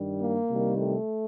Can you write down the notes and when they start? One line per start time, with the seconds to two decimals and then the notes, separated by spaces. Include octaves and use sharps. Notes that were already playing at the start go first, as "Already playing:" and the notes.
Already playing: G2 D#3 G3
0.20 A#3
0.48 C2 C3 D#3 G3
0.77 A3